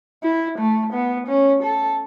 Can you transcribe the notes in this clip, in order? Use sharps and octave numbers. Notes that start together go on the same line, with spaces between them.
E4
A3
B3
C#4
A4